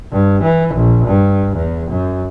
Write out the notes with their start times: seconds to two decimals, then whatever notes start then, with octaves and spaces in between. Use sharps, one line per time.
0.12 G2
0.43 E3
0.75 A#1
1.07 G2
1.57 E2
1.91 F#2